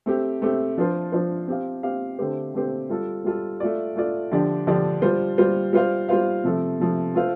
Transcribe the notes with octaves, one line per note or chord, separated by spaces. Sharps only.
A3 C4 G4
A3 C4 G4
F3 D4 F4 C5
F3 D4 F4 C5
C4 G4 F5
C4 G4 F5
D3 A3 C4 G4 C5
D3 A3 C4 G4 C5
G3 F4 A4
G3 F4 A4
A3 F4 D5
A3 F4 D5
D3 F3 D4 G4 D5
D3 F3 D4 G4 D5
G3 F4 C5
G3 F4 C5
G3 F4 C5 F5
G3 F4 C5 F5
C3 F3 A3
C3 F3 A3
A3 F4 A4 C5 F5